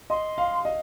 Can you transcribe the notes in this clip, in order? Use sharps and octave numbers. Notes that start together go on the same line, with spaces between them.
D#5 C6
F5
D#5